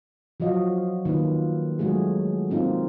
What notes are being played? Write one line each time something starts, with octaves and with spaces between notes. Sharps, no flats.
F3 F#3 F#4 D#5 F5
D#3 A#3 F4 B4
F#3 G#3 A3 F#4 G#4
A#3 C4 D#4 F4